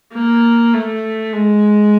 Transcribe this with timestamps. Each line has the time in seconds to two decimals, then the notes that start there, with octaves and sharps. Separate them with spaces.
0.13 A#3
0.74 A3
1.33 G#3